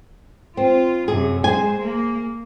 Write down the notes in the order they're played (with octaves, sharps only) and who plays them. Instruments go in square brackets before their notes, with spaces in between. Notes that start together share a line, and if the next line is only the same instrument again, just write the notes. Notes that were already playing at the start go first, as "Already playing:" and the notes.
[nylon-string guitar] C4 [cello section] F4
[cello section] F#2 C3 [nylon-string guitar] G#4
[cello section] G#3 C5 [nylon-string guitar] G#4 G#5
[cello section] A#3